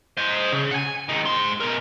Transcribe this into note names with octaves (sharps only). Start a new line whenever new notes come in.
C5 D#5
C#3
F#5 G#5
C#2 D#3
G#2 C6
B2 A#4